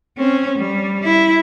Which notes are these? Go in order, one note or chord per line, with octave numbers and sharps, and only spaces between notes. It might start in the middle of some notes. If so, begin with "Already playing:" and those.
C4 C#4
G3
E4